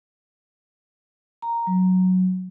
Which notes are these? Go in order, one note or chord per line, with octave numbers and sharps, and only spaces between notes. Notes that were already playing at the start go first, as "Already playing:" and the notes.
A#5
F#3